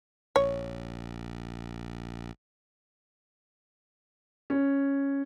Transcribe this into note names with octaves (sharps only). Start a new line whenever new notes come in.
A#1 C#5
C#4